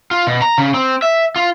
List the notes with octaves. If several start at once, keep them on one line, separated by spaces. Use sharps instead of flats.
F4
B2
A#5
C#3
C4
E5
F4